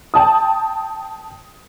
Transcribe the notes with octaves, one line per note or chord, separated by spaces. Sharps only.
G5 A5 D#6